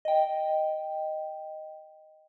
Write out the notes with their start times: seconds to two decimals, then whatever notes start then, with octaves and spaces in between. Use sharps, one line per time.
0.05 D#5 G5